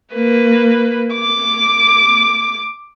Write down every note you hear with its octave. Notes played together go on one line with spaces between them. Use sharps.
A#3 B4
D6